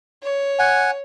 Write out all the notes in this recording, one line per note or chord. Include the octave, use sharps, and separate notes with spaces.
C#5
F#5 G#5